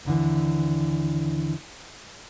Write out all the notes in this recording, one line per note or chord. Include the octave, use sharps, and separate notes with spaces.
D#2 D3 E3